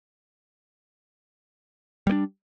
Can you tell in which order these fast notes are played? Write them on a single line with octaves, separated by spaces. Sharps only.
G3 A#3 D4